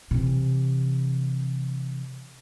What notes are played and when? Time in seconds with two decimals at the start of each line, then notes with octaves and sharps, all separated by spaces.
0.11 C3 E3